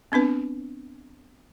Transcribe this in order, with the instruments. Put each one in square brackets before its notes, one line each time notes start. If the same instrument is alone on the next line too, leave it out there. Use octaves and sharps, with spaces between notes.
[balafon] B3 C4 D4 B4